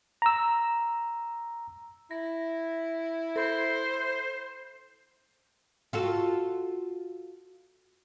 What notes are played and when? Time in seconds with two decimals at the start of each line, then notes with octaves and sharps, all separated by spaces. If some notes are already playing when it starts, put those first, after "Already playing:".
0.22 A#5 E6
2.11 E4 A#6
3.36 A4 C5 B5 C6
5.93 F4 F#4 A4